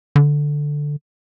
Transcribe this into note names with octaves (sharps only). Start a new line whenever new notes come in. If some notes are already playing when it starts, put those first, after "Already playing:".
D3